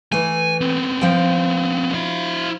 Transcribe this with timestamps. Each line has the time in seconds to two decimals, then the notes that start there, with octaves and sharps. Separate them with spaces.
0.12 E3 A3 G#5
0.61 B3 C4
1.01 F3 G5
1.94 E4 F5